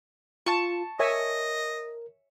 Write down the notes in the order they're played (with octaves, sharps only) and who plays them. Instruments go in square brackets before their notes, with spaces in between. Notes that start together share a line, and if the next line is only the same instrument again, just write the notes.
[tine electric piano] F4 [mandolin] A5 C#6
[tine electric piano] A#4 [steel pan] C#5 E5 G#5 [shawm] D#5